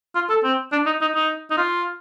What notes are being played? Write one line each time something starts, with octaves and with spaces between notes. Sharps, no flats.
F4
A4
C4
D4
D#4
D#4
D#4
D#4
F4